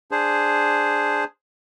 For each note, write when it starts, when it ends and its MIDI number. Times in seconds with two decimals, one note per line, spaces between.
0.11 1.24 62
0.11 1.24 68
0.11 1.24 72